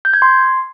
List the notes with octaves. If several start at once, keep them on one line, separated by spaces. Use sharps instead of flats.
G6
G#6
C6